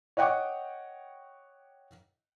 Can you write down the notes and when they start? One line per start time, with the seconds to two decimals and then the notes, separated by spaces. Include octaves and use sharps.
0.17 C#5 D#5 F#5 G5 C#6 D6